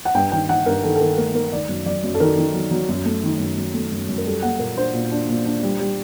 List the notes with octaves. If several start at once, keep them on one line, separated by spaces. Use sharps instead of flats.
F#5
G2 G5
D#3 G5
D#3 F#5
G2 A#4
D#3 A4
A4
D#3 A#4
A3 A#4
A3 A#4
D#3 D5
F#2
F#3 D5
F#2
A4
D#3 A#4
D#3
F#3
F#3
F#2
A3
D#3
F#2
F#2
A3
F#2
F#2
A#4
G3 A4
A#3 F#5
A#2 A#4
D4 C5
A#2
D4
A#2
D4
G3
G3